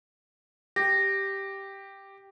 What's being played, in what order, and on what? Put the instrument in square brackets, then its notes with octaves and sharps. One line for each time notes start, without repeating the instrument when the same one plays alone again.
[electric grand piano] G4 [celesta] A#6